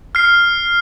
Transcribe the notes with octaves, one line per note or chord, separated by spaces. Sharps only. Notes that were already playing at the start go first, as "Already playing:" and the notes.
F6 C7